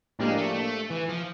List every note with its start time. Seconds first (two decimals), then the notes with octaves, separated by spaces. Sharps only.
0.19 A2 F3 G#3 A#3 D4 G4
0.37 A3
0.54 A3
0.90 E3
1.09 F3